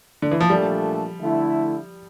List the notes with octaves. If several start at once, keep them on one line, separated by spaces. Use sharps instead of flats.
D3
E3
F3
A#2 G3 A3 D4 A4
D3 A3 E4